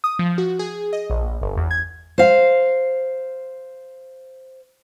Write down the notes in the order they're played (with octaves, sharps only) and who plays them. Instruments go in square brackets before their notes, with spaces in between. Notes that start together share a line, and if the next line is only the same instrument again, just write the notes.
[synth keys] D#6
F3
F#4
G#4
D#5
A#1
G1
E2
G#6
[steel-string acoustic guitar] C5 F5